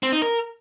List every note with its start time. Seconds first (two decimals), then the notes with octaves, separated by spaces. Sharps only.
0.03 C4
0.12 D#4
0.22 A#4